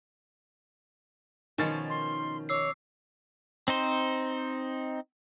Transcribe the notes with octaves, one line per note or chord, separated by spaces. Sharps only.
B2 D#3 F3 C#4 A6
C6
C#5 D6 E6 C7
C4 D#4 C5